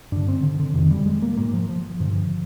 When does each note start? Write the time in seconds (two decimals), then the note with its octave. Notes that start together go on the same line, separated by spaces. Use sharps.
0.12 G2 D3 D4
0.28 C4
0.43 D3
0.60 D3
0.74 F2 C3 D#3
0.91 G3
1.06 G#3
1.22 A#3
1.37 G#2 A#3
1.53 F3
1.69 F3
2.00 G2 D3 F3